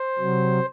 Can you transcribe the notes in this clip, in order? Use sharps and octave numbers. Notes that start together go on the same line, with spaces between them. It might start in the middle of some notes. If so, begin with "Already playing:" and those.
Already playing: C5
C3 F#3